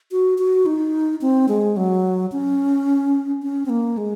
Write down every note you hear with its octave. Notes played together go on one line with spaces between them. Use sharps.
F#4
F#4
D#4
C4
G#3
F#3
C#4
C#4
C4
A#3
G#3